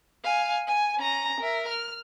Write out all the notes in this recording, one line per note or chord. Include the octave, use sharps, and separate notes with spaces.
F5 G#5
G#5
C#4 A#5
A#4 E5
F6